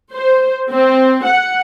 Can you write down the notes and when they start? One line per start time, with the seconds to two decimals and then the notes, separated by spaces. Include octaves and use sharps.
0.13 C5
0.71 C4
1.26 F#5